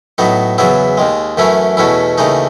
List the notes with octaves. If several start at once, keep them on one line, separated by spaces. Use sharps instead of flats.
A2 F#3 B3 D#4
E2 C#3 F#3 B3 E4
D#2 D#3 G#3
F#2 E3 A3 C#4 E4
E2 B2 A3 C#4 E4
D#2 C#3 E3 A3 D#4